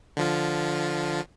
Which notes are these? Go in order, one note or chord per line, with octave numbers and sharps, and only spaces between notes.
D3 F3 F4